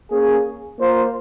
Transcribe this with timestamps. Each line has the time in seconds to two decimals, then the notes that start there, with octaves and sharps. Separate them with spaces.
0.11 A#3 C#4 G#4
0.79 A#3 F4 C5